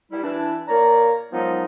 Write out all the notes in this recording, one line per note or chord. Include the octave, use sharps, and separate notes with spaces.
G3 E4
E3 D4 E4
A#2 A#3 C#5 D5 A#5
D#3 F3 F#3 G#3 B3 D#4